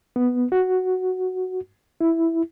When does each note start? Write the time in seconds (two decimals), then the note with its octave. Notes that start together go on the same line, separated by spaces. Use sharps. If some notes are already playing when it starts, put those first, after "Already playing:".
0.16 B3
0.52 F#4
2.01 E4